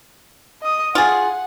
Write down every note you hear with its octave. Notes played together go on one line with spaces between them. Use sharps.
D#5 D#6
F4 G#4 F#5